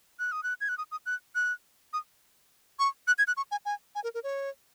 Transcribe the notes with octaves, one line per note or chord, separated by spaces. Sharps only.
F#6
D#6
F#6
G#6
F#6
D#6
D#6
F#6
F#6
D#6
C#6
F#6
G#6
F#6
C#6
G#5
G#5
G#5
A#4
A#4
C#5